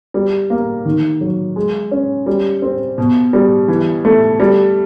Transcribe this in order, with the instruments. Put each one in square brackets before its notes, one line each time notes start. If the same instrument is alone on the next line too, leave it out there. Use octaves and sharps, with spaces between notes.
[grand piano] G3
A#3
D#3
F#3
G#3
C#4
G3
C4
B2
G3
E3
A3
G3